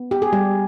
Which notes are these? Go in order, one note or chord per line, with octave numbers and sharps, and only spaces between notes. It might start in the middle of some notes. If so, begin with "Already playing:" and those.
Already playing: B3
G4
G#4
G3 G4